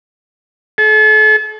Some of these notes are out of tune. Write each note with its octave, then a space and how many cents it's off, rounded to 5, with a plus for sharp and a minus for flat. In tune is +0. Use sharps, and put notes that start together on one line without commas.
A4 -40